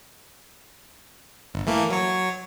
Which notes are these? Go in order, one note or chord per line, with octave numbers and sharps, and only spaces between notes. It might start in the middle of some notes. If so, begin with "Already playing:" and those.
G1
E3 A3 A#3
F#3 C#5